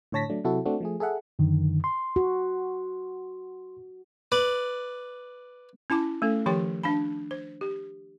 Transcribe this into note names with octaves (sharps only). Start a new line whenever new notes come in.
A2 D3 C#5 A5 A#6 B6
F#3 A3 D4
C3 F#3 E4 F#4 A4
A3 C4 D4 F#4 A4
F3 A3 G#4
G#4 A4 E5 F#5
F#2 D3 D#3
C6
F#4
B4 D5
C#4 E4 A5 D6
A3 C#4 A4
D#3 F3 G4 C#5 G5 C6
D4 F5 A5 B5
C5
G4